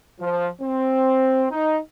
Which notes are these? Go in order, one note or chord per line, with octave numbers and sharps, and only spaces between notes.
F3
C4
D#4